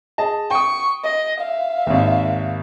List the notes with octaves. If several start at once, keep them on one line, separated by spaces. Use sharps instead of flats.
G#4 D#5 A5
G5 C#6 D#6
D#5
E5 F5
G#1 D#2